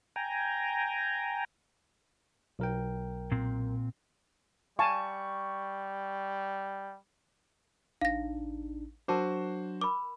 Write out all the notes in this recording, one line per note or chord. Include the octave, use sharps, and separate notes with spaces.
G5 G#5 A#5
B1 A#4 G5
A#2 C4
G3 F5 G#5 A5 C#6
A1 D4 D#4 F5 A#6
F#3 D4 F#4 A#4 C5 A5 D6
A#4 B5 D6